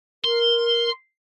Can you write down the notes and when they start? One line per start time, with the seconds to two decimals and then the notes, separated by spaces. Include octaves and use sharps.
0.25 A#4 C6